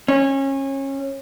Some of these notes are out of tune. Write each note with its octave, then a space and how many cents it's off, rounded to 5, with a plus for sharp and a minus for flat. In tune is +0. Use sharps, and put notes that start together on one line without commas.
C#4 -25